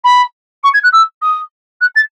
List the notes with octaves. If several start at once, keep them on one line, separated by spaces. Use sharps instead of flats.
B5
C#6
G#6
F#6
E6
D#6
F#6
A6